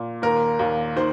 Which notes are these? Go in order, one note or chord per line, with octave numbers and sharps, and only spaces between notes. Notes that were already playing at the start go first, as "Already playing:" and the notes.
Already playing: A#2
D#2 A#4
D#2
D#3 C5